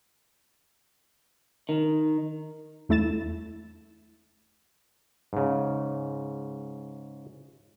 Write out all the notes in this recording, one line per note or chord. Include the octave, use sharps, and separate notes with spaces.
D#3
E2 A3 E4 A6 E7
G#2 C#3